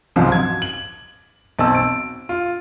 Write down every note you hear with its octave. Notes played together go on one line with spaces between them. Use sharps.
C#2 G#2 C3 F3 F#3
G#6
F#7
B1 C4 A5 E6
D7
F4